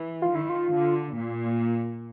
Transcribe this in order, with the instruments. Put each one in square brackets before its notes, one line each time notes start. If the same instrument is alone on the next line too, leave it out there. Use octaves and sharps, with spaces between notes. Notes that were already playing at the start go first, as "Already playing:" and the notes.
Already playing: [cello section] E3
[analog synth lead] F4
[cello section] D#3
[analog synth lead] E4
F4
[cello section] D3
A#2